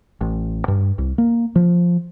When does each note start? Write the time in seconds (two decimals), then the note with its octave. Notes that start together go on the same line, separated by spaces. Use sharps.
0.21 A1
0.68 G2
0.98 C2
1.18 A#3
1.56 F3